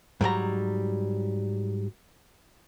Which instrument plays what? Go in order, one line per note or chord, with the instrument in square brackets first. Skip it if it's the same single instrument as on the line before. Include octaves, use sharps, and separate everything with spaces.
[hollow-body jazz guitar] G#2 F#3 G3 A#5